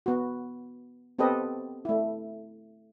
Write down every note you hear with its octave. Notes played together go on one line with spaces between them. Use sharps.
B3 F#4
B3 C4 G4 A4 B4 D#5
A3 E4